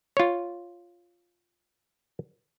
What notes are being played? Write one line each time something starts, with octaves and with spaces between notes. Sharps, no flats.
F4 C#5